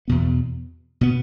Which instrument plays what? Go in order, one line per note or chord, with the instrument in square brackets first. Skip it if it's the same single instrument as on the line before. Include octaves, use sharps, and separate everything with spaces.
[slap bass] E2 B2 B3
B2 B3